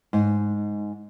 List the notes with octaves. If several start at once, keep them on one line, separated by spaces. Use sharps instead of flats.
G#2